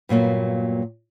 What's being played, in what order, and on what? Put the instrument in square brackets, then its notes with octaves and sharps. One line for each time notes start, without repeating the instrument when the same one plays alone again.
[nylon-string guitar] G2 A#2 F#3 A#3 B3